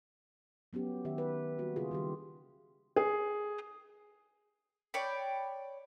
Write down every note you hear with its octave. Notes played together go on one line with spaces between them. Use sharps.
F#3 B3 C#4 G4
D#3 G4 E5
B4
G3 A#3 F#4
C#3 F4 G#4
D#3 G3 G4
G#4
C#5 D5 G5 B5